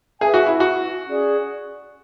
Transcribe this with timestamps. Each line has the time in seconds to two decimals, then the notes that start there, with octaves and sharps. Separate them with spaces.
0.20 G#4 B4 E5 G#5
0.34 F#4
0.46 E4
0.60 F#4
1.06 C#4 G#4 D5